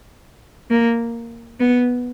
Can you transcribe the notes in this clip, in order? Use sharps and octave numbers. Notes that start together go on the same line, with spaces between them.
A#3
B3